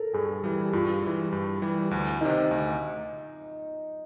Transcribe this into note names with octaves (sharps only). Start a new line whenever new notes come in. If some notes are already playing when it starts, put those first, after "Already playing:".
Already playing: A4 A#4
G2 G#4
E3 G3 G4
G2 F4
E3 G3
G2
E3 G3
D2
C3 D#3 D#4
D2